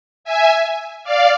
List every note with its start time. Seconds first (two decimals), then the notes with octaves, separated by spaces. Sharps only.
0.24 E5 G#5
1.04 D5 F5